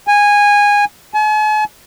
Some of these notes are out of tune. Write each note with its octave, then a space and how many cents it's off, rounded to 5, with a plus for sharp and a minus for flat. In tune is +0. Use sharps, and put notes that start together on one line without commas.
G#5 -15
G#5 +45